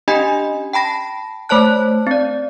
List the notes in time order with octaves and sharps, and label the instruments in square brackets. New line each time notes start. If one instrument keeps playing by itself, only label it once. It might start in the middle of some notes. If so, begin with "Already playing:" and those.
[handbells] C#4 D4 G4 D#5 G#5 B5
G5 A5 B5 A#6
A3 C5 C#5 A5 F#6
C4 D5